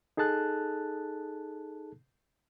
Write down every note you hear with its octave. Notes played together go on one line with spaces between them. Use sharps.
D#4 G#4 A4 A5 F#6